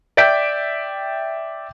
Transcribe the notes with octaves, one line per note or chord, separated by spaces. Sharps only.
D5 E5 G5 G6 B6 D7